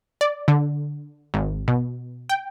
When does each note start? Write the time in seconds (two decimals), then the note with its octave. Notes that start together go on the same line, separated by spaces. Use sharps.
0.21 D5
0.48 D3
1.34 G#1
1.68 B2
2.29 G5